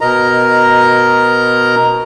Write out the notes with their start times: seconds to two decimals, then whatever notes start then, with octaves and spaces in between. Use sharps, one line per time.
0.01 B2 A#4 D#5 A#5